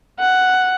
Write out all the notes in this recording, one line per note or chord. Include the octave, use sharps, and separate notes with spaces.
F#5